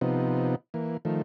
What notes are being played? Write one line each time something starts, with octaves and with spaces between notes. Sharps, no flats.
C3 F3 B3 D#4
E3 A#3
D#3 F3 A3